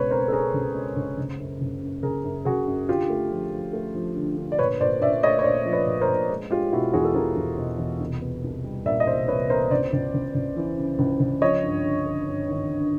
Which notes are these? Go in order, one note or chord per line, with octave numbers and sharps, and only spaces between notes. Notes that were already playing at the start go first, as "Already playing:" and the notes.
Already playing: C#2 B2 G#3 B4 C#5
C4 A#4 C5
A4
C4 G#4 A#4
C#2
G#3
C#2
F#1
F#2
F#1
F#2
F#1 G#4 A#4
F#2
F#1 F#4 G#4
F#2
D3 F4 G4
A3
F3
F3
A3
F3
D3
D3
D5
A#2 B4 C#5
A#2 C5 D5
A#2 D5 E5
A3 C#5 D#5
C#5
A#2 C5 D5
F3
B4 C#5
A#2
A#4 C5
A#2
G#3
G#3 F4 G4
B2 E4 F#4
E2 F#4 G#4
A4
E2 G#4 A#4
E2
B2
E2
C2
B3
C2
G3
A#2 D5 E5
D#5
C2 C5 D5
C2 B4 C#5
B3 A#4 C5
C#2 C5 D5
C#2
C#2
C#2
E3
C#3
C#2
C#2
F3 C#5 D#5
G2
D3
D3
G2
G#1
D3